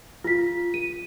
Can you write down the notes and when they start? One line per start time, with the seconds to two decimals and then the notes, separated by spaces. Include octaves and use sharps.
0.24 F4 B6
0.74 D#7